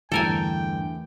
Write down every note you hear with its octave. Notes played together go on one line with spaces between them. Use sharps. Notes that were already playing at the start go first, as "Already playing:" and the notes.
E2 G2 D3 A3 A4 A#4 G5 G#5